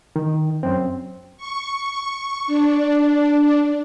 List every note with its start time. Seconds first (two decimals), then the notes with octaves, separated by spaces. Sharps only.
0.16 D#3
0.63 F#2 C4
1.37 C#6
2.47 D4